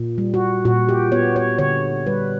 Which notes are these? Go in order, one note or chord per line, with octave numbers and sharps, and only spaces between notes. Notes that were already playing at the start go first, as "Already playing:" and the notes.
Already playing: A#2
G3
F#4
A#2 F#4
G4
B3 C#5
C#5
D3 C#5
G3 B4